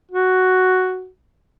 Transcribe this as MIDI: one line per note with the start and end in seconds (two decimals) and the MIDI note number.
0.11 1.08 66